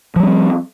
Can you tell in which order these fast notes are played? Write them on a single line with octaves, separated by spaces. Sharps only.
F3 G3 C#4 C4